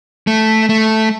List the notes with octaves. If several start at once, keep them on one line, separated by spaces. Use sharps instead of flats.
A3
A3